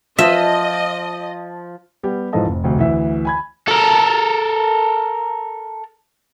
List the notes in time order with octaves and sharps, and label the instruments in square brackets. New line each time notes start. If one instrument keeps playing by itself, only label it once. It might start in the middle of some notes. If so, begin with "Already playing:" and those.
[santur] F3 [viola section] D#5 [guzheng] E5
[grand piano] G3 B3 G4
G#2 E3 F3 A4 D#5 A5
F1
F1 D2
D2 E3 E5
G#5 B5 G#6
[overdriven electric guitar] A4 A#4